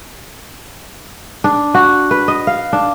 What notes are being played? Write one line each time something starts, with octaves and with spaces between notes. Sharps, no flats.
D4
F#4
B4
D#5
F5
D4